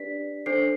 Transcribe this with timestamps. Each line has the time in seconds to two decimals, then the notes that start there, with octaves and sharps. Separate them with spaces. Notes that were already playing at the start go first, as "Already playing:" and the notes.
Already playing: D4 G4 B4 D5 B6
0.46 D4 A4 C5 C7